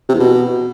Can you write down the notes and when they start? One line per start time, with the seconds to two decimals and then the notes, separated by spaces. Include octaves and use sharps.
0.09 C3
0.14 E2
0.20 B2